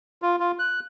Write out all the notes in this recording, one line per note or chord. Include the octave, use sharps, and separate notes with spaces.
F4
F4
F#6